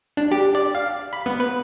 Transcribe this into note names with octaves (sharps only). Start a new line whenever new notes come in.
D4
G4
D5
F5
B5
B3
B4